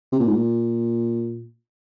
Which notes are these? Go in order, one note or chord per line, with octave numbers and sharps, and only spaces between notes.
C3
A#2
G#2
A#2